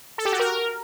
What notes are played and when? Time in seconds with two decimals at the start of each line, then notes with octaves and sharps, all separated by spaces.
0.18 A4
0.25 G4
0.32 F#4
0.39 A#4